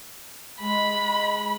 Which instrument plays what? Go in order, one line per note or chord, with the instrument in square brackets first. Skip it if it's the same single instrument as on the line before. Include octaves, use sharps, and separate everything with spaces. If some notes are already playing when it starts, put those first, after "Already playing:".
[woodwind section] G#3 [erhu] B5